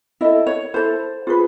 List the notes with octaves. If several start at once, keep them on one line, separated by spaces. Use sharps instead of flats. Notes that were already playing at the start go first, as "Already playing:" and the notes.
E4 A4 D#5
C#5
E4 A4 C5
F4 G#4 B4